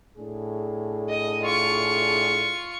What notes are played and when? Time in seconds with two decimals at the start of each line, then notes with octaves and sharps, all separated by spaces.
0.17 A2 D4 G#4
1.09 D#5
1.45 F4 C#6